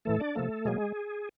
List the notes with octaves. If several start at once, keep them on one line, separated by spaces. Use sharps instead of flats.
A2 E3 A3 A4
D4 D5
C3 F3 A3 A#3 A4
B2 F#3 G#3 A#3 G#4